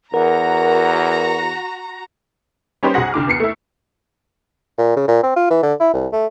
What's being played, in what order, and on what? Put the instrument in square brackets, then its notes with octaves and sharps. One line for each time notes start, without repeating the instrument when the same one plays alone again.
[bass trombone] E2 [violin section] F#4 A#5 [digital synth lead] A#4 [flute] F#5
[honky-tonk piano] G3 C#4 D#4 G4 B4 C5
B1 F#4 G#4 F#5 A#6
C2 D3 D6 F6
E2 B3 C7 C#7
A3 E4
[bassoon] A#2
C#3
A#2
C4
F4
E3
D3
E4
C2
A3